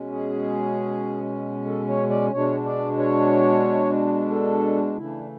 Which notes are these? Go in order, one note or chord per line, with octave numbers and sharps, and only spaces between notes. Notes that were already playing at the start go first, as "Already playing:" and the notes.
Already playing: B2 G#3 C#4
G#4
A4
C#5
D5
B2 G#3 D4 C#5
D5
C#5
A4
C#3 E3 A3 D4 E4